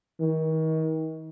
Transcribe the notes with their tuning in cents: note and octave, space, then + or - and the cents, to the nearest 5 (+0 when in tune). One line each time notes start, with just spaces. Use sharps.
D#3 +35